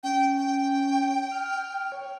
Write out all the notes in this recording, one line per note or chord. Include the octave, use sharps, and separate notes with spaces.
C#4 G5
G5
F6
C#5